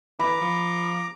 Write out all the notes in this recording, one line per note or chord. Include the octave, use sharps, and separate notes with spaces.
E3 A#5 B5 D6
F3